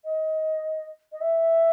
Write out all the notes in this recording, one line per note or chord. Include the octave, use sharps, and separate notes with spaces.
D#5
D#5
E5